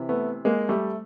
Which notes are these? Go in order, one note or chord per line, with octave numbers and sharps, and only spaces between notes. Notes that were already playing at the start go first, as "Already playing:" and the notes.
Already playing: C3 E3
A3 B3
G#3 A#3
G3 A3